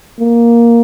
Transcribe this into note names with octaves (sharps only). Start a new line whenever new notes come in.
A#3